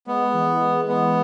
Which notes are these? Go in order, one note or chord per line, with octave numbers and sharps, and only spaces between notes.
G#3 B3
E3
G#3
G#3 B3